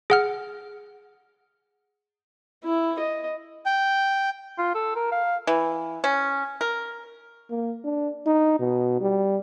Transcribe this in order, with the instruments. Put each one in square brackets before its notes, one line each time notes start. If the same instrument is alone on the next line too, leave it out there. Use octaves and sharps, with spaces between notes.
[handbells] G#4 F#5 F6
[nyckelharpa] E4
D#5
[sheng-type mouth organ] G5
[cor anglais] F4
A4
A#4
F5
[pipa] E3
C#4
A#4
[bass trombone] A#3
D4
D#4
B2
G3